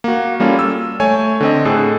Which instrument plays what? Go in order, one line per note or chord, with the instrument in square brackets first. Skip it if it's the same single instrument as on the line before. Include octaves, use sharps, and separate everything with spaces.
[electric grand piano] A#3 F#4
G3 A#3 C#4 F4 A4
E6
A3 C#5 G#5
D3 C4 D#5
A2 G#4 A4